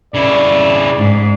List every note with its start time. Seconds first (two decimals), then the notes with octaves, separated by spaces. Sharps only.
0.14 C#3 E4 D5
0.97 G#2